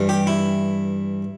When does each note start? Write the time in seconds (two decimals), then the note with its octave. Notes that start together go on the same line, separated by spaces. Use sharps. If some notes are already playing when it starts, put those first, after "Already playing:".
Already playing: G2 E3
0.09 G4
0.27 E4